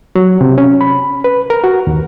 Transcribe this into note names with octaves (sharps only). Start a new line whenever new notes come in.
F#3
C3
C#4
B5
B4
A#4
F#4
D#2